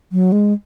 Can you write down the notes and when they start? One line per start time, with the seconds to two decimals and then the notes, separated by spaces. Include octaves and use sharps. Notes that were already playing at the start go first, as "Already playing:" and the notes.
0.12 F#3
0.32 G#3